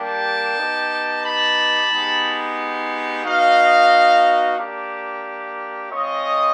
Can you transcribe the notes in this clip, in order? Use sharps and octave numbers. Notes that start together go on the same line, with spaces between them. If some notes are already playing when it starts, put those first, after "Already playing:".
Already playing: G3 A#3 D4 G4 G5 A5
B3 D#4 G4
A5 B5
G#3 B3 D#4 G4
B3 D#4 F#4 D#5 F5
A#3 D4 G4
G#3 C4 F4 C#5 D#5